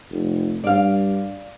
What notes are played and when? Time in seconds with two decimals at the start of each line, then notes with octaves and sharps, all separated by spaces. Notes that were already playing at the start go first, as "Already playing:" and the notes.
0.10 F1
0.64 G2 D5 F5